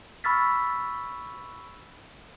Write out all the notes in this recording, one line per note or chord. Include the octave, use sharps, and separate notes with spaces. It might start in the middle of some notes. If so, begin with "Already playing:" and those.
B5 C#6 E6 F6 A6 B6